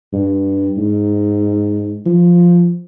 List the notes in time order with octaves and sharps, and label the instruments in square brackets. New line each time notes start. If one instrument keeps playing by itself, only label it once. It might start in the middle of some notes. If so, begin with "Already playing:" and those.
[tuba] G2
G#2
F3